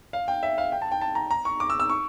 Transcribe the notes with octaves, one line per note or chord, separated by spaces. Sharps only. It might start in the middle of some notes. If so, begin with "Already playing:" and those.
F5
G5
E5
F5
G5
A5
G5
A5
A#5
A#5
C#6
D6
E6
E6
C#6